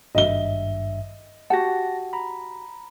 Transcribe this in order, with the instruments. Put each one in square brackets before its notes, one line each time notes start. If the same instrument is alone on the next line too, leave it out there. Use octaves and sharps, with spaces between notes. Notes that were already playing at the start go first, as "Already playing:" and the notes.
[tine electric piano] G#1 G2 E5 [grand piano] D#5 G7
[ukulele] F#4 G4 F#5 [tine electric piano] A5 A#6
[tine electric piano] A#5 B5